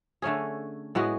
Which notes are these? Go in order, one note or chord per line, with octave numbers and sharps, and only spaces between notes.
D3 A3 C#4 G#4
A2 G#3 B3 F#4